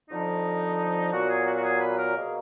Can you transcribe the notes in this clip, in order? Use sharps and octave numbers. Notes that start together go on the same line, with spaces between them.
F2 D3 F3 D#4
A#2 F#3 B3 F#4
G#4
F#4
F#4
G#4
B4
A#4
B2 A#3 G#4